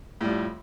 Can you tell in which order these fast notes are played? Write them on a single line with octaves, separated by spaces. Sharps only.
A2 G3 F2